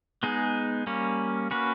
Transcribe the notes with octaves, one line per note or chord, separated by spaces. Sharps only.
G#3 B3 D#4 G#4
G3 A#3 C#4
A#3 C#4 F#4 B4